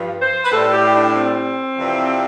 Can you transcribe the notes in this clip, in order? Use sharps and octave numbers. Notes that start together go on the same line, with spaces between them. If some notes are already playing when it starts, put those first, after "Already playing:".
Already playing: G2 F3
C5
B4
A2 G3 A4
G4
D4
C4
F2 C3 E3 G3